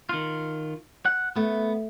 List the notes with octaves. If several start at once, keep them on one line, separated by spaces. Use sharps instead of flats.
D#3 F4
F#5
A3 B3